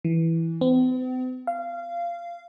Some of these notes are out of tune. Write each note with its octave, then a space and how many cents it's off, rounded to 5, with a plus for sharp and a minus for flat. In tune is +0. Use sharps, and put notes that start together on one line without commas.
E3 -5
C4 -45
F5 -20